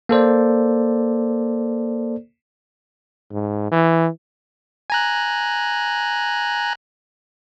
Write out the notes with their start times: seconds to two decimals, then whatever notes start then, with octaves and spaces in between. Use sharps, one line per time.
0.09 A#3 A4 C5 D5
3.31 G#2
3.72 E3
4.90 G#5 A#5 F#6